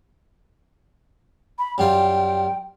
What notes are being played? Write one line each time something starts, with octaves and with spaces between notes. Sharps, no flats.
B5
F#2 G3 F4 G5